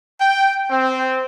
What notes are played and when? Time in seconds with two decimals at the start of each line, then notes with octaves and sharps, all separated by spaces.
0.21 G5
0.71 C4